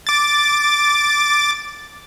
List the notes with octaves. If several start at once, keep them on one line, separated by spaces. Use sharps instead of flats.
D6 A6